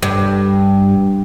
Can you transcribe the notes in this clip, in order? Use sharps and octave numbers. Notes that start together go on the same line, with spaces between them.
G2